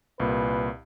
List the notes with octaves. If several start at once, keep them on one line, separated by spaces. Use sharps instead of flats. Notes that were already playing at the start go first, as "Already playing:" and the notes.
C2 A#2 B4